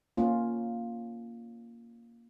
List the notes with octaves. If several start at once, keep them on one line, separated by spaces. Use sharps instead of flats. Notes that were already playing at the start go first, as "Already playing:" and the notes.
A#3 C#4 F4